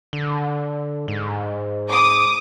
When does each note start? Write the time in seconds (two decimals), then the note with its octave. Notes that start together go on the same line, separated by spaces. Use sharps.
0.13 D3
1.08 G#2
1.88 D6 D#6